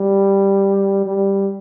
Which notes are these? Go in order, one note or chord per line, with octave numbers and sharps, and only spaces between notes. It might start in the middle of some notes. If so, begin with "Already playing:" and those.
Already playing: G3
G3